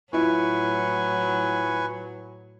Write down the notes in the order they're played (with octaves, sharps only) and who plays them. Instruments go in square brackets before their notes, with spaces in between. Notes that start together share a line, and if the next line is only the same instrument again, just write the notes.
[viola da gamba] A2 F#3 [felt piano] E4 F4 [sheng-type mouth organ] B4 G#5 C#6